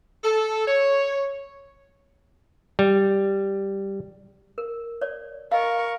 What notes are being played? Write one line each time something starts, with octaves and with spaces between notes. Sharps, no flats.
A4
C#5
G3
A#4
C#5 D5
A#4 D#5 F5 C#6